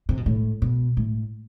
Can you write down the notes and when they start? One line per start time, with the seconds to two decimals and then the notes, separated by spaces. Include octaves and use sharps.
0.09 C3
0.17 B2
0.26 A2
0.62 B2
0.97 A2